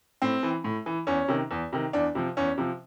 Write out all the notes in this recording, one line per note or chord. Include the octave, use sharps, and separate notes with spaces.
A2 C4
E3
A2
E3
E2 C#4
C3 D#3
E2
C3 D#3
E2 D4
C3 F3
E2 C#4
C3 F3